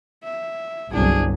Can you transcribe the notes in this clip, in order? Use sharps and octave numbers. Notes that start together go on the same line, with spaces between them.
E5
G1 C2 F#3 D4 G#4